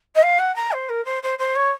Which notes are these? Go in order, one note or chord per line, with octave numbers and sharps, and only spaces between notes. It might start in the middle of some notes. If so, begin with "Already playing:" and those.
D#5
F5
F#5
A#5
C5
A#4
C5
C5
C5
C#5